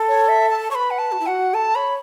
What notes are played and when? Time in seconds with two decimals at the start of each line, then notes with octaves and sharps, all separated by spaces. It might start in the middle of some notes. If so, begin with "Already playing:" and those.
Already playing: A4
0.08 C#5
0.28 E5
0.50 A5
0.71 C#5 C#6
0.75 B4 B5
0.91 F#5
0.98 A5
1.12 F#4
1.20 E4
1.26 F#4 F#5
1.54 A4 A5
1.75 C#5 B5